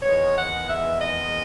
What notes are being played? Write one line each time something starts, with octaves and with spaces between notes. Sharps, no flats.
E2 D#3 G#3 B3 C#5
F#5
E5
D#5